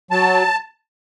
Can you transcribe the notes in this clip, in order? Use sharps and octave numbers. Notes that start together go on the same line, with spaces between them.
F#3 A5